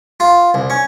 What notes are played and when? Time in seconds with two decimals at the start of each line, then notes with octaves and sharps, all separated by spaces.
0.20 F4
0.54 C2
0.70 C#4